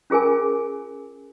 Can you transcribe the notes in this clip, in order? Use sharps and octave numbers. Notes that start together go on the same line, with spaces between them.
C#4 F4 G#4 A#4 G#5